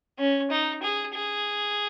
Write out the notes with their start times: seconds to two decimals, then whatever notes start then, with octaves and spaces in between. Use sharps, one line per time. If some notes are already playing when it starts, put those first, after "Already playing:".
0.19 C#4
0.50 D#4
0.83 G#4
1.14 G#4